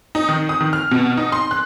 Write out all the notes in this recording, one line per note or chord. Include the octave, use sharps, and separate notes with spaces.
D#4
D#3
D#6
D#3
F6
B2
D#4
C6
F#6